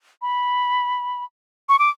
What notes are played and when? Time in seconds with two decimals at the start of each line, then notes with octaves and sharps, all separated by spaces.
0.22 B5
1.69 C#6
1.79 D6